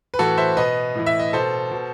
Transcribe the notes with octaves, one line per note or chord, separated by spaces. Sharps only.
B4
A2 E3 F#4 A4
C5 E5
B2 B4 D#5
A2 E3
E5
D#5
B2 A4 C5
B2